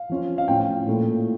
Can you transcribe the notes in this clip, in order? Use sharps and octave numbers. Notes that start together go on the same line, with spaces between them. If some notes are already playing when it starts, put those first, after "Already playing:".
Already playing: F5
F3 C#4 F4
F5
A2 F3 C#4 F4 G5
A#2 A3 E4